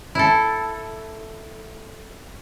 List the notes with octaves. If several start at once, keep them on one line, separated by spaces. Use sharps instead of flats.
E4 A4